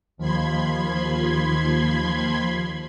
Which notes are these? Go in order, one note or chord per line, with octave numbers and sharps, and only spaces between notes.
D#2 F3 B5 C6 G#6